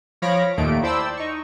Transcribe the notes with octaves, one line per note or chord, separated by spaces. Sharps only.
F3 C#5 F5 B5 A#6 D7
D#2 A#2 D#3 A3 A#3 D7
E4 C5 D5 G5 A5 E6
D#4 C#6